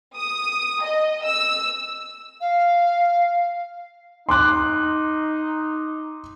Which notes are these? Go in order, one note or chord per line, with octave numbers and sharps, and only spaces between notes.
D#6
D#5
E6
F5
D#4 C6 D6 F#6